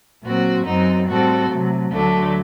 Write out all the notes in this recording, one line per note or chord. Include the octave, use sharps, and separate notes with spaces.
A#2 F#3 C4 F#4
F#2 F#3 C4 D#4
A2 G3 C4 F#4 A4
C3 F#3 A3
D2 D3 F#3 A3 D4